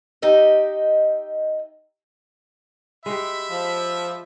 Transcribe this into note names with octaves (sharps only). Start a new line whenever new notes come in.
D#4 G4 D#5 E5
G#3 F#4 G4 E5 B5
F3